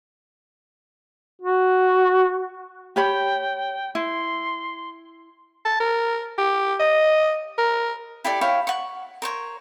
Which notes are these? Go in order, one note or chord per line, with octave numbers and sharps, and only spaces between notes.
F#4
G4 C#5 G5 B5
E4 C6
A5
A#4
G4
D#5
A#4
E4 G4 A4 D5
E4 C#5 F5 G5
F#5 C#6
A#4 C5 C#5